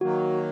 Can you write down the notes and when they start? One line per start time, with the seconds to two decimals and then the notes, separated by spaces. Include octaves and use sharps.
0.01 D#3 F#3 A#3 F#4